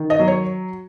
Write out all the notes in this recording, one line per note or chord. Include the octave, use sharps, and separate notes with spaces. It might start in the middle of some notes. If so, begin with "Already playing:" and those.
Already playing: D#3
D#5
F#3
C#5